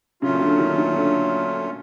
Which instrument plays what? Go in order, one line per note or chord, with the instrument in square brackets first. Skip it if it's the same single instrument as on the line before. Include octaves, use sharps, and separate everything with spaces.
[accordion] A#2 F#3 A3 C#4 F4 [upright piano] C#3
[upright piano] D3
D#3
D#3
D3